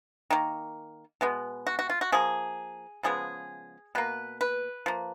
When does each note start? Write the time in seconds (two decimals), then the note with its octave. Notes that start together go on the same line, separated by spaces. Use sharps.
0.30 D#3 A#3
1.21 B2 G#3 B3
1.67 F#4
1.79 F#4
1.90 F4
2.01 F#4
2.12 F3 A#3 G#4
3.03 C#3 F3 G#3 B3 G#4
3.95 B2 A#3 B4
4.41 B4
4.86 F3 A#3